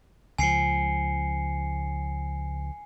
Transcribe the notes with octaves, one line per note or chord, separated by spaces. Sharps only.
C#2 F3 G#5 C7 C#7